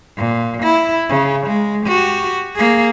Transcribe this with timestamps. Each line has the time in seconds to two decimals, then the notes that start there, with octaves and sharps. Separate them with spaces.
0.17 A#2
0.63 E4
1.09 C#3
1.47 G#3
1.86 F#4 G4
2.55 A#3 G#4